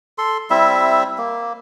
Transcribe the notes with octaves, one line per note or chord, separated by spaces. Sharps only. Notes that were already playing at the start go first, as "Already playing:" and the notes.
A4 C6
G3 C4 E4 E5
A#3